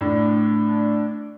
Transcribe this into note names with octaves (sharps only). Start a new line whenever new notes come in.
A2 D4